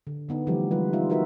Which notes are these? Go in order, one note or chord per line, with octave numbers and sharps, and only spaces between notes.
D3
D3 B3 D#4
D3 E3 F3 G3 A3 G4
G3 G#3 F4 B4
D#4 F4 E5
D#4 F4 F#4 A#4 B4 E5